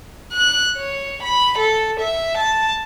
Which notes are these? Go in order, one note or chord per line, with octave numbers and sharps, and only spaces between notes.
F#6
C#5
B5
A4
E5
A5